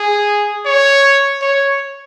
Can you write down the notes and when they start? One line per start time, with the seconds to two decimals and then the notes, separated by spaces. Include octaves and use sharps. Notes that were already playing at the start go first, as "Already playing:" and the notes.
Already playing: G#4
0.66 C#5
1.42 C#5